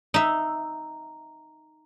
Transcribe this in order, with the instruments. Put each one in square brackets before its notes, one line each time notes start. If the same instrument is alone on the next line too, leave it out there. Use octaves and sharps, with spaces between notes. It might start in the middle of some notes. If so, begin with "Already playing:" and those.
[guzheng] D#4 E5